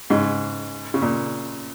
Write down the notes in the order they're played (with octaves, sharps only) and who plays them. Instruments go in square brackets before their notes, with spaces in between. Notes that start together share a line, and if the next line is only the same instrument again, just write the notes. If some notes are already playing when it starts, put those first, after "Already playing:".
[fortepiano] G#2 C#3
C#3
A#2